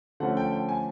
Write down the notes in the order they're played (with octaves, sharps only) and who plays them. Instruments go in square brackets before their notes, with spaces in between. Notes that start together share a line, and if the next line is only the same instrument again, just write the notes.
[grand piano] D3 F3 A3 C#4 F#5
G5
G5
G#5